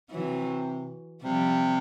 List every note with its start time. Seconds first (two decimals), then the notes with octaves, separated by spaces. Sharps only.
0.10 C3 E3 F#3
1.22 C3 F3 G3